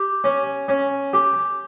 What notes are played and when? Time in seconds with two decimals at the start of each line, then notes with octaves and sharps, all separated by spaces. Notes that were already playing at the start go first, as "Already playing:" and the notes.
Already playing: G4
0.24 C#4
0.68 C#4
1.13 G4